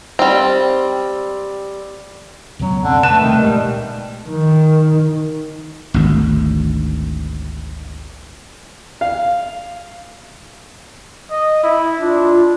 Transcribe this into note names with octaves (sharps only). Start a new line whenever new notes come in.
G3 C4
C#2 B2 F#3 C#4
F2 D3
A3 B4 A5
C3 D#3 G3
D2 A#2 G3 G#3
D#3
G#1 D2
F5
D#5
E4
D4 F4